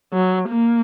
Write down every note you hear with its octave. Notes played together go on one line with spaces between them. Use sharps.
F#3
A#3